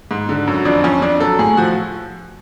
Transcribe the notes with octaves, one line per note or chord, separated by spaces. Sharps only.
G#2
D3
F#2
F2 D4
F2 C#4
F2 D4
F#3 A4
A2 G#4
F3 F#4